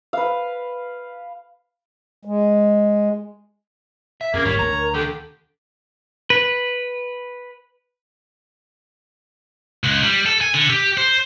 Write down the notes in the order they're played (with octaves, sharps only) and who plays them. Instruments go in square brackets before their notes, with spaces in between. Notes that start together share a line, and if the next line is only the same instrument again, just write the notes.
[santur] B4 F5
[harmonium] G#3
[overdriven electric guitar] E5
[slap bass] F2 [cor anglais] A#3 [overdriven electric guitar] C#4 G#4 [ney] A#4
[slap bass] D1 G#1 [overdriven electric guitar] G3 [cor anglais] C#5
[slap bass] D2 [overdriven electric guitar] A#5
[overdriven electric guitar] D3 D#3 [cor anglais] G4 [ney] A4
[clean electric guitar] B4
[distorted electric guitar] C#2
G3
A4
G#5
D3
G4
C5